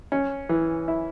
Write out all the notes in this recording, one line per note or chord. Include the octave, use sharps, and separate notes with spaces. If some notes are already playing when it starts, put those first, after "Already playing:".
C#4
E3
E4